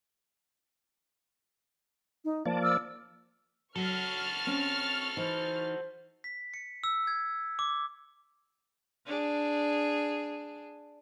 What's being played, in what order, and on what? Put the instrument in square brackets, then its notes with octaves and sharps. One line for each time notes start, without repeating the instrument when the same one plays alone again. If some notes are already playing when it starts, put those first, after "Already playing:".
[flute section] D#4
[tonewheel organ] F3 A#3 D5 [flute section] A5
[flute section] D6 E6 F6
[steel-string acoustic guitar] F#3 [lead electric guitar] F#4 A4 [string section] C#6 F6 A6
[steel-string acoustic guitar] C4 C#4
[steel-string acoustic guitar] E3 D#4 [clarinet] C5
[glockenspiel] B6
C#7
E6
G#6
D6
[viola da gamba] D4 G#4